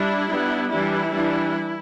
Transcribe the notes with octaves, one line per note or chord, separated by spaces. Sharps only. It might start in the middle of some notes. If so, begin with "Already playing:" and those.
Already playing: G3 D4 E4
G3 B3 D4
E3 G3 D4 E4
E3 G3 D4